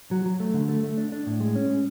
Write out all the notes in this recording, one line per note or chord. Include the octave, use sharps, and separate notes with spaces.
F#3
F#3
A3
D3
A3
A3
D4
D4
A2
G#3
C#4
G#3